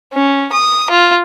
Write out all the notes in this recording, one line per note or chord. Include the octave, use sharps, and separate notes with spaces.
C#4
D#6
F4